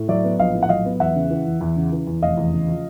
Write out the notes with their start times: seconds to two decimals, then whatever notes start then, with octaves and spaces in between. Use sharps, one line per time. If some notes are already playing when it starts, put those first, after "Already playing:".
Already playing: A2
0.08 F#3 D5 E5
0.24 B3
0.39 A#1 D#5 F5
0.54 A2
0.63 F#5
0.69 F#3 D#5 F5
0.85 B3
1.00 E2 E5 F#5
1.15 C#3
1.30 E3
1.46 E2
1.61 E2
1.77 C#3
1.92 E3
2.07 E2
2.22 F1 D#5 F5
2.37 E2
2.53 C#3
2.69 F3